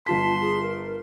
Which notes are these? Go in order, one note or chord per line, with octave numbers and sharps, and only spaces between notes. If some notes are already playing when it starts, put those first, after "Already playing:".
G1 F4 A5 C6 B6
G#4
A#4